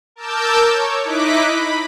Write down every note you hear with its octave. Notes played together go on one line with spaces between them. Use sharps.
A#4 A5 D6 E6 G6
C#5
D#4 E4 D#5 D6 F#6 B6
B5